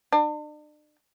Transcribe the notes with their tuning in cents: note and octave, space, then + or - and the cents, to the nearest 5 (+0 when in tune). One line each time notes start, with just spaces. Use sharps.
D4 +40